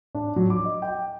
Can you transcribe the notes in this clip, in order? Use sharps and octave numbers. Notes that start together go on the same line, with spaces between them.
D4
F#3
D6
D#5
G5